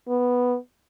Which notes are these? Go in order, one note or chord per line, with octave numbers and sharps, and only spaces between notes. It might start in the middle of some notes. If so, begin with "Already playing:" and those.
B3